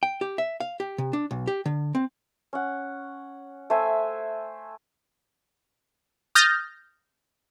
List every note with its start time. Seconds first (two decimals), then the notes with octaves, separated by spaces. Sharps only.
0.03 G5
0.21 G4
0.38 E5
0.60 F5
0.80 G4
0.98 C3
1.13 D4
1.31 B1
1.47 G4
1.66 D3
1.95 C4
2.53 C#4 F#5
3.70 A3 C5 E5 G#5
6.35 D#6 F6 G6 A6 A#6